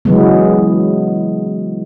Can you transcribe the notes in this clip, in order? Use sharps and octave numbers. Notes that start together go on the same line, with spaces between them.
C#3 E3 F#3 G#3 B3